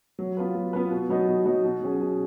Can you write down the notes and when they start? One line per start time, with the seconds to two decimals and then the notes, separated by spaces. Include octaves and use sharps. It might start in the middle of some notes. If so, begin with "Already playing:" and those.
0.19 F#3
0.37 B3 F4 B4
0.55 F#3
0.73 B3 F4 B4
0.91 B2
1.09 F#3 B3 D#4 F#4
1.28 B2
1.45 F#3 B3 D#4 F#4
1.64 B2
1.81 F#3 C#4 G#4
2.00 B2